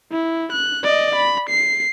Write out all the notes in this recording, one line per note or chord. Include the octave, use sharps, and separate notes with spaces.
E4
F#6
D5 D#5
B5
C7